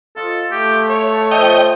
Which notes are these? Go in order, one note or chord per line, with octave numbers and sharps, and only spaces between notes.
F4 A4 D#5
A3 G4
C#5
F3 D#5 G5